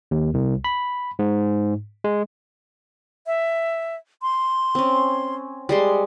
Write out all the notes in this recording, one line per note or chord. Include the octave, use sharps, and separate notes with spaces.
D#2
C2
B5
G#2
G#3
E5
C6
C4 C#4
G3 G#3 C6